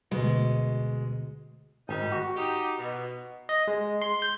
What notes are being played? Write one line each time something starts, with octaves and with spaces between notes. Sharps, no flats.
D2 B2 G#3
G#1 G3 D#4
F#4
D#4 G4
B2
D#5
G#3
C6
G6